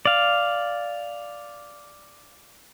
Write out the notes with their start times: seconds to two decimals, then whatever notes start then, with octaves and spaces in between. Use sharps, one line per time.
0.06 D5 F5